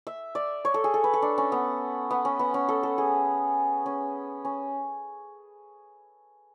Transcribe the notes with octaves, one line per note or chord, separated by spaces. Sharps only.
E5
D5
C#5
A4
G#4
A4
B4
A4
D4
C#4
B3
B3
C#4
B3
C#4
A4
A4
G#4
C#4
C#4